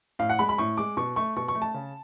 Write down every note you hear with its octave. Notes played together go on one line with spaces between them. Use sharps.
A2 F5
F#5
G#3 B5
B5
A2 C#6
G#3 D6
B2 C#6
A3 C#6
B2 C#6
C#6
A3
A5
C#3